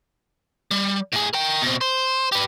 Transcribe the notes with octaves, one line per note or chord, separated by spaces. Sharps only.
G3
A2 G#4
A#4 G5
B2 C4
C5
G4 B4